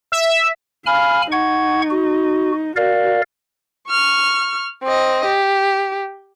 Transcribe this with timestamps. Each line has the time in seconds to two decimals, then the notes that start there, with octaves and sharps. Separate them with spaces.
0.12 E5
0.86 F5 G#5 B5 F6
1.32 D#4 F#5 C#6 G#6
1.91 F#4
2.76 F#4 A#4 D5 F5
3.89 C#6 F6
4.83 C4 D#5
5.25 G4